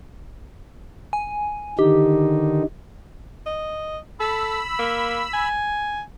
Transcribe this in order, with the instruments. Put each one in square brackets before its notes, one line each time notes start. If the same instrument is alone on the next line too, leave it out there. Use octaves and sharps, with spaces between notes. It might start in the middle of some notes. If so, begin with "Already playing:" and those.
[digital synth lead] G#5
[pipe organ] D3 D#3 D#4 [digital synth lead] G4
[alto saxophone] D#5
[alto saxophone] A4 [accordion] B5 E6
[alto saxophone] A#3
G#5